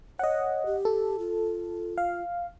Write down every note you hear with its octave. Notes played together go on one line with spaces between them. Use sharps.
C#5 D#5 F#5
G4
A4
F4
F5